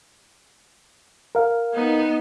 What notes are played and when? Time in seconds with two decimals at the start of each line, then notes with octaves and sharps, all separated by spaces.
1.35 A#4 F5
1.73 B3 D#4